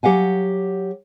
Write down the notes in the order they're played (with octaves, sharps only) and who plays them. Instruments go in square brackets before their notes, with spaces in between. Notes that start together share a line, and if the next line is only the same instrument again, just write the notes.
[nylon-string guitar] F#3 G4 F5 F#5 G#5